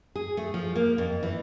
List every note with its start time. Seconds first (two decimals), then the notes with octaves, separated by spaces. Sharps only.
0.15 G#4
0.37 A3
0.54 F3
0.76 A#3
0.98 F2
1.23 E3